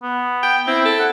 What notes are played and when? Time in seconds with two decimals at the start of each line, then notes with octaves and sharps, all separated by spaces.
0.03 B3
0.43 G5
0.67 C4 E4
0.85 A4
0.99 F#5